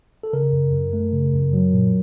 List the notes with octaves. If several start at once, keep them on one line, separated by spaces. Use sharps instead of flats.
A4
C#3 A#4
F#2
F#2
A3
C#3
F#2
F#3
A#2